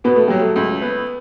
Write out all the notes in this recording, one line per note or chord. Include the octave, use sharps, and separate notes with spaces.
B2 B3
A3
F#3 G3
A3
C#2
B3